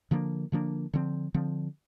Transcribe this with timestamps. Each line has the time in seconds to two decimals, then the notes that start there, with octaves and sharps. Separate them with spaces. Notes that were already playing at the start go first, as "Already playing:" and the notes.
0.11 D3 F3 A#3 D4
0.52 D3 F3 A#3 D4
0.93 D3 F3 C4
1.34 D3 F3 C4